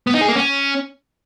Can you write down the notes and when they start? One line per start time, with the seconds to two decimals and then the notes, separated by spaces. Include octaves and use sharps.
0.07 B3
0.14 D#4
0.21 G#4
0.28 A#3
0.36 C#4